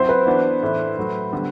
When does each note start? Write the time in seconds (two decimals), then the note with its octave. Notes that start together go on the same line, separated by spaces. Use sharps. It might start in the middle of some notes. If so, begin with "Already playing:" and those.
Already playing: F#3 C4 E4 C5
0.09 B4
0.26 E3 B3 D4 F#4
0.62 A2 E3 A3 D4
0.97 A2 F#3 A3
1.33 D3 G3 B3